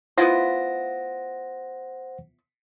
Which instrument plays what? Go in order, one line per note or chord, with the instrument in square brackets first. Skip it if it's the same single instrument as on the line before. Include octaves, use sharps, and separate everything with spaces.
[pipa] B3 E4 F4 [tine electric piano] C5 F#5 A#6